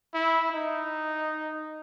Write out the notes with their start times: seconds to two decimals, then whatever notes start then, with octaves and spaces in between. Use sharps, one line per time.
0.14 E4
0.52 D#4